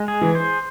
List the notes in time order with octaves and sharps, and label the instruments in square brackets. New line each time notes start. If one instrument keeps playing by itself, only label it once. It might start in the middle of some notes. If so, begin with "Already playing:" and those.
Already playing: [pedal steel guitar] G#3
G#4
[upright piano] E3
[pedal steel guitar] C5